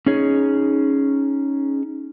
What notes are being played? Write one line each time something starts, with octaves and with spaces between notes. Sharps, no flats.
C#4 D#4 G#4 C#5